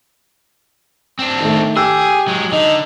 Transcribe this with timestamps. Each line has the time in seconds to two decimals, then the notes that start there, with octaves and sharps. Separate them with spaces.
1.19 C4 D4
1.41 D#3 A3
1.77 G4 G#4 E6
2.28 F#3 G#3
2.52 D3 D#4